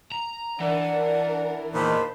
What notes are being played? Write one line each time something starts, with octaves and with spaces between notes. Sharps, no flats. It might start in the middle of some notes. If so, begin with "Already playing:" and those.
A#5
E3 D4 A#4 D5 F#5
E2 A#2 D#3 C5 A5 B5